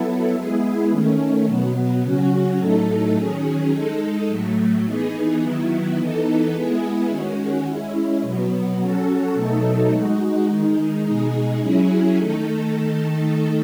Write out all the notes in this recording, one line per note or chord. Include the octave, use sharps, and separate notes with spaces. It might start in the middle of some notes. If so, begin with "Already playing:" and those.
Already playing: F#3 B3 E4 A4
G#3 B3 E4 G#4
D#3 A3 C#4
B2 F#3 B3
C#3 F#3 C#4 F#4
A2 F#3 A3 D#4 A4
D#3 F#3 C#4 G#4
G#3 D#4 A4
A2 F#3 A3
E3 B3 D#4 G#4
D#3 F#3 B3 E4
E3 B3 D#4 A4
G#3 B3 E4 G#4
D#3 G#3 C#4 F#4
G#3 C#4 E4
B2 F#3 B3
F#3 C#4 F#4 A4
B2 F#3 A3 D#4 A4
G#3 D#4 F#4
D#3 G#3 D#4
B2 G#3 D#4 G#4
F#3 C#4 E4 G#4
D#3 A3 D#4 A4